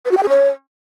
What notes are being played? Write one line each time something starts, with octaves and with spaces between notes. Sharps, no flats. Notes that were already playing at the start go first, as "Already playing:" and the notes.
B4
F#4
G5
G#4
C#5